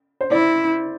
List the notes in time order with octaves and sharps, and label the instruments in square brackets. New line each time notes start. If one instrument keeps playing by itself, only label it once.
[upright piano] C5
[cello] E4 [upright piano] D5